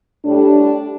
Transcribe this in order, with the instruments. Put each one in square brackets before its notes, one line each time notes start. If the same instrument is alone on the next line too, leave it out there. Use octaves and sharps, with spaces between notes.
[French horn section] A2 G3 D4